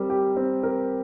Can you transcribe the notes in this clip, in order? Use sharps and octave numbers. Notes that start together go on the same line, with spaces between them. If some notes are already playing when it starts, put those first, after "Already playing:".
Already playing: G3 C4 A#4
G4
C4
A#4